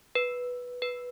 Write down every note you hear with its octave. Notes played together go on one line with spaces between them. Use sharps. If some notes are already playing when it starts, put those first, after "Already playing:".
B4
B4